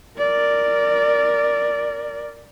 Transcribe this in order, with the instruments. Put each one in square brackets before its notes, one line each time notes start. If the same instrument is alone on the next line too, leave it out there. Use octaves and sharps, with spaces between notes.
[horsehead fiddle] A#4 D5